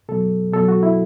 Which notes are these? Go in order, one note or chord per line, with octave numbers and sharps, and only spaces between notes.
B2 F#3 A4
B2 F#3 A4
F#4
E4